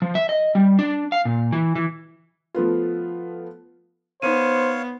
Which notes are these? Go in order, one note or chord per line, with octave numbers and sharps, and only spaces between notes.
F3
E5
D#5
G3
D4
F5
A#2
E3
E3
F3 A3 B3 F4
B3 D#4 C5 C#5 F5 D#7